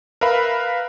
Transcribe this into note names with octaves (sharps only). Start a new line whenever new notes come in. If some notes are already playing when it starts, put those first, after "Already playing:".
A#4 B4 E5 F5 B5